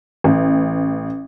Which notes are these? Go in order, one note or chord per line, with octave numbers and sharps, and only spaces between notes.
A1